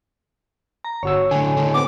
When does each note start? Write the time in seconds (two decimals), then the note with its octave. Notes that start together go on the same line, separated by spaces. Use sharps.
0.84 A#5
1.03 G1 F#4 C#5 E6
1.31 A2 D3 G#5
1.57 A2 D3
1.74 B3 C4 D6